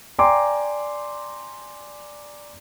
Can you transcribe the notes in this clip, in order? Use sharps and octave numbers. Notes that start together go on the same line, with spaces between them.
D5 G5 G#5 A#5 C6 D6